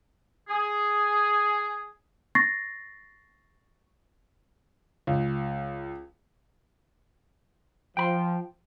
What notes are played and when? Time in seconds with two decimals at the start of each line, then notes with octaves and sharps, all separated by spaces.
0.48 G#4
2.35 C#6 A6 A#6 C7
5.07 C#2
7.97 F3 G5 B5 C6